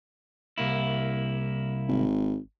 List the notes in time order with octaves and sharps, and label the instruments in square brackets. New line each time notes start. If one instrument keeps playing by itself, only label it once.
[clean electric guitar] C2 A#3 E4
[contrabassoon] G#1